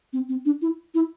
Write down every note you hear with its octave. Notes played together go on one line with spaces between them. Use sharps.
C4
C4
D4
E4
E4